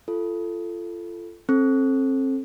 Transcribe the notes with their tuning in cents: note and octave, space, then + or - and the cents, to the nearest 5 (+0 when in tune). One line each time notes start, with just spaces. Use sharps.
F4 -25 A4 +0
C4 +30 A4 -10